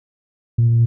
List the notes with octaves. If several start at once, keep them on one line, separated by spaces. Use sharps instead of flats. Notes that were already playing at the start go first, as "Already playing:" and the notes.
A#2